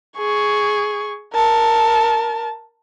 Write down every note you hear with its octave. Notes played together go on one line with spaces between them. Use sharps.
G#4 C#6
A#4 A5